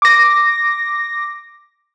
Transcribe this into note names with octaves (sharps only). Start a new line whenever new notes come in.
D6 A#6